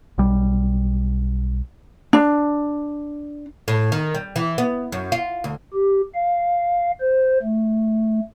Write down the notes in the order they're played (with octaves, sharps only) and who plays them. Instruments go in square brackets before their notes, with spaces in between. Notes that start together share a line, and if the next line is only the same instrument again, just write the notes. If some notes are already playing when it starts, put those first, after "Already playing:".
[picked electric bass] B1 G3
[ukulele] D4
[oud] A2
D#3
G3
E3
B3
F#2
F4
D2
[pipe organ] G4
F5
C5
A3